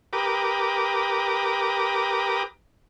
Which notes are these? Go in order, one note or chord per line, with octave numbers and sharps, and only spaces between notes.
G4 A#4 B4 D6 D#6